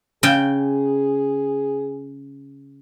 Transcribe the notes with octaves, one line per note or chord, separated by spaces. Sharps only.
C#3 G#4 G5